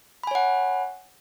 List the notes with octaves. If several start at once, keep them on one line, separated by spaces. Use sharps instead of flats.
C#5 F#5 G#5 B5